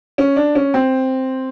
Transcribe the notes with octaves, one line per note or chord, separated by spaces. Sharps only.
C#4
D4
C#4
C4